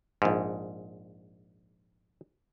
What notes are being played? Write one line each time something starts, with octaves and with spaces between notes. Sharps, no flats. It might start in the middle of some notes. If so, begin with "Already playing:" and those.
A#1 G#2